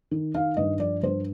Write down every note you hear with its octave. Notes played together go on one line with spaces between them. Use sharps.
D#3
D#3 F5
G2 D#5
F3 D5
G2 C5